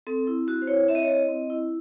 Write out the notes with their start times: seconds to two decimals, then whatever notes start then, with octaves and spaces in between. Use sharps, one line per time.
0.07 C4 A4
0.27 E4
0.47 C4 F#4
0.62 C5
0.67 E4 C#5
0.88 C4 E5
0.95 D#5
1.03 C#5
1.09 E4 D#5
1.29 C4
1.50 E4